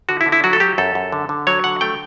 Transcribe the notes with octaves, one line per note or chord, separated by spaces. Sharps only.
D3 F#4
E4
D3
E4
F#3 F#4
A4
F#3 G4
F#2 A4
F#2
D3
D3
F#3 C#5
D3 F#5
A3 G5